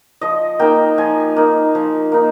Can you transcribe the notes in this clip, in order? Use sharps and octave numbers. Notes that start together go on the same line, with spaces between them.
F3 D#5
A#3 D#4 G5
F3 G#5
A#3 D#4
F3
A#3 D#4